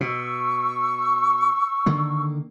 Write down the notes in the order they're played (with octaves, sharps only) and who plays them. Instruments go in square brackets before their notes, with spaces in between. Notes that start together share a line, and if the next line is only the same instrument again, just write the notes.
[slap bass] B2 [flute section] C#6 E6
[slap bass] D3 D#3 A#3